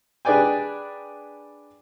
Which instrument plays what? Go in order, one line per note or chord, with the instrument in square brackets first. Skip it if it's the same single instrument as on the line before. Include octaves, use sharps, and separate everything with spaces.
[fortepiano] D4 G#4 B4 D5 G5 G#5